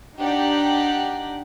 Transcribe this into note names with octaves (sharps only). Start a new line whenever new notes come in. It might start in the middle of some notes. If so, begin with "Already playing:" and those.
D4 D#4 G4 D5 F#5